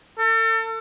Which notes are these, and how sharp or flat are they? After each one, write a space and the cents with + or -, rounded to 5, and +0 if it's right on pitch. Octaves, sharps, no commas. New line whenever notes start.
A4 +35